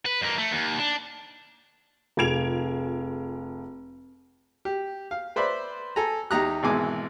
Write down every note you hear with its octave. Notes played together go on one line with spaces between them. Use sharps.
B4
F2 A#3
A3
D#2
D4
F1 F4 G#4 G#6 D7 F7
G4
F5
B4 C5 D5 E5 B5
A4 G#5 A#5
E2 D#4 G4 A#5 D#6 F#6
G#1 B2 E3 G#3 G#5 D6